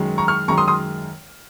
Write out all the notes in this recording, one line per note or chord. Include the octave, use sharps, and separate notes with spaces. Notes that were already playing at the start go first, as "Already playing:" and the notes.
Already playing: F#2 D#3 G#3
A#5 C#6
C#6 F6
F#2 D#3 G#3 A#5 C#6
C6 D#6
C6 D#6